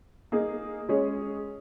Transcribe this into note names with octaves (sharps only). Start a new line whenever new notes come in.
A#3 D#4 G#4
G#3 C#4 G#4 C#5